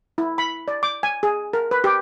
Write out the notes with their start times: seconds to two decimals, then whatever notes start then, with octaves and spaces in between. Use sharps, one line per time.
0.18 E4
0.38 B5
0.68 D5
0.83 D6
1.03 G#5
1.23 G#4
1.53 A#4
1.71 B4
1.84 G4